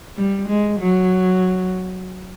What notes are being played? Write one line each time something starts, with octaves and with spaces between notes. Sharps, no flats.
G3
G#3
F#3